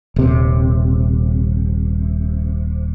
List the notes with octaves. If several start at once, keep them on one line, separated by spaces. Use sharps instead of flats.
D#1 C3